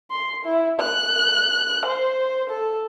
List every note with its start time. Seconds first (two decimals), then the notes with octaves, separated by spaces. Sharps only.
0.11 C6
0.45 E4
0.80 F#6
1.86 C5
2.50 A4